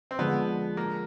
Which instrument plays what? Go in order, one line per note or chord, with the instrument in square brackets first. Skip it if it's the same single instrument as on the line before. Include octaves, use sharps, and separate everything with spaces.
[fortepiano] C4
[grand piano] D3 F3 G#3 [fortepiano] B3
[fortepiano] A#3